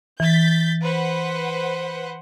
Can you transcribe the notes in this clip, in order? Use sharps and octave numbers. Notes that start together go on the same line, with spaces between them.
E3 G6 A6 B6
B4 C5 F#5